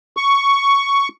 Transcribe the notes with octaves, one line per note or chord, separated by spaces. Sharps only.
C#6